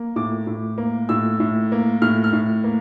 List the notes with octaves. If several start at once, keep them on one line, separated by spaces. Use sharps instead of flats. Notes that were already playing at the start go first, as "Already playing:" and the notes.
Already playing: A#3
A2 D6
A2
A#3
A2 E6
A2
A#3
A2 F6
F6
A2
A#3